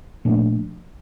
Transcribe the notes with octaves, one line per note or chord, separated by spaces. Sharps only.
A#2 F3 A3 D4